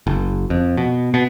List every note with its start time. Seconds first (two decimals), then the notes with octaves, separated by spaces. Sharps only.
0.07 F#1
0.50 F2
0.77 B2
1.14 B2